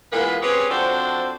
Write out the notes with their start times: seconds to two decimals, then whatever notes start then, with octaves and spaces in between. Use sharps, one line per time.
0.12 E3 G#3 A#3 B3 F4 B4
0.42 C4 C#4 G4 G#4 B4 C#5
0.69 F3 C4 D4 F#4 A4 C5